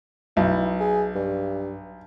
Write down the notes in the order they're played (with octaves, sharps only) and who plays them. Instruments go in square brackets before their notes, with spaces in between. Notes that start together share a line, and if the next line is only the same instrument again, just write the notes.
[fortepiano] B1 [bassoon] E4
[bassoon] G#4
G2